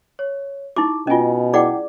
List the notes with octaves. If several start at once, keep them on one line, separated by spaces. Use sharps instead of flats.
C#5
D#4 E4 G4 D6
B2 C#4 F4 D#5 G#5
E4 G#4 D5 F#5 G5 D6